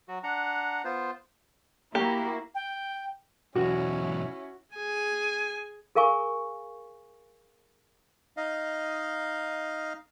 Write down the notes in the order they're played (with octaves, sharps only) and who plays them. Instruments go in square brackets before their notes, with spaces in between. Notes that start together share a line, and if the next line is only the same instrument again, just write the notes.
[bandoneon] F#3 F#4
D4 F#5 A#5
B3 F4 C5
[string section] A#3 E4 F#4 [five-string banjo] G4
[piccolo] G5
[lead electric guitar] B1 E2 [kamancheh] C#4 E4 [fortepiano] F#4
[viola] G#4 G#5
[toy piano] G#4 A#4 F5 G#5 C#6
[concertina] D#4 D#5 F5